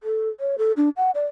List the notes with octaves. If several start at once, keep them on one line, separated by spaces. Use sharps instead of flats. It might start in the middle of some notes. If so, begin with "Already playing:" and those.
A4
C#5
A4
D4
F#5
D5